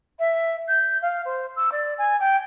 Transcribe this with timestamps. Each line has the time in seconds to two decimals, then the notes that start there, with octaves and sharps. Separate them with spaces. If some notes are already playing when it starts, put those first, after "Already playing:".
0.19 E5
0.68 G6
1.01 F5
1.25 C5
1.56 E6
1.72 D5
1.98 G#5
2.19 G5